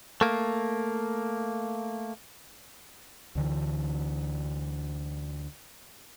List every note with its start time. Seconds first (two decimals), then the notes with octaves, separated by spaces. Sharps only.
0.21 A3 A#3
3.35 D2 D3 E3